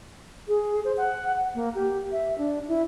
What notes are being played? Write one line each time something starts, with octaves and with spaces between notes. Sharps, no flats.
G#4
C5
F#5
A#3
G4
E5
D4
E4